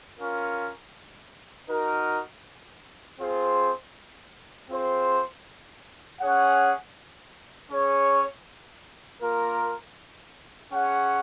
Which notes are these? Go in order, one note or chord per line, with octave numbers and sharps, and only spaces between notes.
C#4 F4 A#4
D#4 F#4 A#4
C4 F4 G#4 C5
C4 F4 G#4 C5
C#4 G#4 C#5 F#5
C#4 G#4 C#5
A#3 F4 A#4
C#4 G#4 C#5 F#5